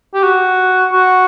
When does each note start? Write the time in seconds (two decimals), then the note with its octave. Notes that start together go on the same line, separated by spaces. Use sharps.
0.15 G4
0.23 F#4
0.93 F#4